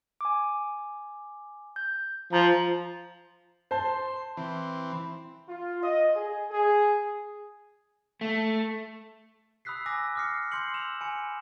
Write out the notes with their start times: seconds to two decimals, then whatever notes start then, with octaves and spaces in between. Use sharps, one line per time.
0.21 G#5 D6
1.76 G6
2.33 F3 A#5 G6
3.71 C5 A5 C6
4.37 E3 C4
5.49 F4
5.83 D#5
6.16 G#4
6.50 G#4
8.21 A3
9.65 B5 D#6 E6 F#6 B6 C7
9.86 G#5 D6 E6 A#6
10.15 D6 D#6 F6 A#6 C7 C#7
10.52 C6 G6 C7 C#7 F#7
10.74 E6 E7 F7
11.01 G#5 B5 C#7